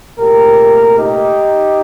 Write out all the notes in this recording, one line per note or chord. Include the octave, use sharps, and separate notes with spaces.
C2 A#2 A3 C4 G4 A#4
D#4 G4